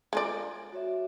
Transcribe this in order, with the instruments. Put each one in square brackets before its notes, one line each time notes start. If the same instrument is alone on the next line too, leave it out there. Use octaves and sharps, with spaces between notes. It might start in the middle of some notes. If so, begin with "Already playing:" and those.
[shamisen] G#3 F4 D5
[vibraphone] F#4 C#5 E5